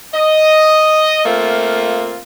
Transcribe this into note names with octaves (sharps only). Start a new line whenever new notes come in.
D#5
A3 A#3 C4 F4